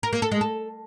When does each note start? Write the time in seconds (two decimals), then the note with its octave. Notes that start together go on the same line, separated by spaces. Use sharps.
0.03 A#4
0.13 A#3
0.22 A4
0.32 G#3
0.41 A4